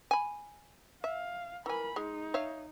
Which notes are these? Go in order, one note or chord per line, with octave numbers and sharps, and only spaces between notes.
G#5 B5
E5 F5
E3 A#4 G#5 B5
G#3 D#4
C#5 E5 F5